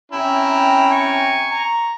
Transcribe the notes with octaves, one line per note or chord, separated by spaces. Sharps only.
C3 C#4 E4 G5 A#5
G#5 C#6
A#5